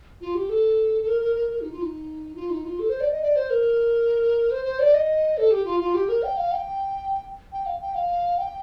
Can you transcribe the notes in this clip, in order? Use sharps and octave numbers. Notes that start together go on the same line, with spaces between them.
F4
G4
A4
A4
A#4
A#4
A#4
A#4
D#4
F4
D#4
F4
D#4
F4
A4
C5
D5
D#5
D5
C5
A#4
C5
C5
D5
D#5
A4
G4
F4
F4
G4
A#4
G5
F5
G5
G5
F5
G5
F5
G5